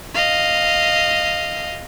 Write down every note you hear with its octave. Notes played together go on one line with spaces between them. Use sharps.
D#5 F5